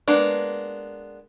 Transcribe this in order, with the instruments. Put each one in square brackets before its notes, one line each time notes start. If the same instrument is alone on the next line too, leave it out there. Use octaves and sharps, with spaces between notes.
[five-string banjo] G#3 A#3 B3 D4